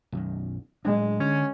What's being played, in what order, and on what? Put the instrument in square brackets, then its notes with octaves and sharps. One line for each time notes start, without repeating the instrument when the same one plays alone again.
[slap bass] B1 F#2 D#3
[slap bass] A2 F#3 D4 [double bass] G#3
[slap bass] D3 [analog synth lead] C#4